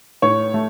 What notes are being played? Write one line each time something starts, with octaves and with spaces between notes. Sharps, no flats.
A2 C#5
A3